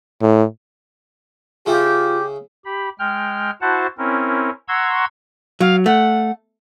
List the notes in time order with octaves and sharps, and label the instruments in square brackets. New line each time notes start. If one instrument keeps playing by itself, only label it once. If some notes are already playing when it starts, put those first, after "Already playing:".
[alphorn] A2
[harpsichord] C#3 E4 [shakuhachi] F4 [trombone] G4
[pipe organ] G4 B5
G#3 G5 F6
E4 F#4 C5 F#5 A5
C4 C#4 E4 A#4
F#5 A#5 C6 C#6 E6 G#6
[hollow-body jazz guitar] F#3 [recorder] F5
[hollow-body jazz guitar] A3 [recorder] F#5